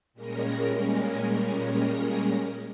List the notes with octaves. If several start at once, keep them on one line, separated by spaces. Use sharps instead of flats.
A#2 G3 G#3 C#4 A#4 A#6